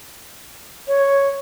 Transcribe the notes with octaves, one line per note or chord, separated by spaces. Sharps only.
C#5